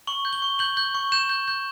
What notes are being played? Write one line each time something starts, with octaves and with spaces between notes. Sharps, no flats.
C#6 F#7
G6
G7
C#6
G6 F#7
G6
C#6
G6 E7
G6
G6